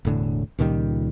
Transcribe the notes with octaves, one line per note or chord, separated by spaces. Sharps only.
E1 A2 D3
C#2 A#2 D#3 G3